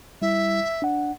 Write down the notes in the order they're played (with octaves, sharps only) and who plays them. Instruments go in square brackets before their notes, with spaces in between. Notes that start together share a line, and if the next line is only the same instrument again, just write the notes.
[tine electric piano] G3 E4 [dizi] E5
[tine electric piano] D4 F#5